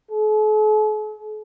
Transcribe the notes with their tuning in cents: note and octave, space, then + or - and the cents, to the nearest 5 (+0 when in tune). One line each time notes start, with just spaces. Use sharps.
A4 -45